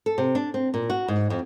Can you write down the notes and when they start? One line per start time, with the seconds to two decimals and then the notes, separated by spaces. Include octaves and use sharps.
0.06 A4
0.18 C3
0.35 D4
0.54 C4
0.74 A#2
0.90 F#4
1.08 G#2
1.30 F2